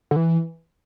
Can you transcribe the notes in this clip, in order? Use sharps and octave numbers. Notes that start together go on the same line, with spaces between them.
D3
E3